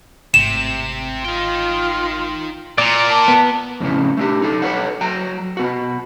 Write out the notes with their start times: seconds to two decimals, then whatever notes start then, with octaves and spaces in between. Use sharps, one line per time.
0.34 G#1 A2 C3 E7
1.25 D#4 F4 G5
2.78 A#2 D5 A#5
3.09 A5
3.28 B3
3.80 F2 A2 C#3 B3
4.17 A3 D4 G4
4.42 D#4 A4
4.62 A4 B4 C#5 F#5
5.01 F#3 G5 A#5
5.57 B3 F#4